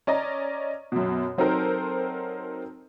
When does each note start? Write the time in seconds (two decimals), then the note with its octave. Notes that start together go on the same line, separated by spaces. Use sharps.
0.07 C#4 D5 D#5 A#5
0.92 F#2 B2
1.38 F#3 C4 D#4 A4 A#4 C5